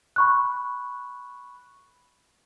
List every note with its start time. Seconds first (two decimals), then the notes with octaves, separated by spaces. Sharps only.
0.16 B5 C#6 F#6